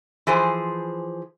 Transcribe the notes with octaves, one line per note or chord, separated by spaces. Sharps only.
E3 F3 G#4 C5